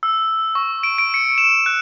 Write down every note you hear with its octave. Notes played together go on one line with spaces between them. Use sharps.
E6
C#6
D7
D7
C#7
E7
F#6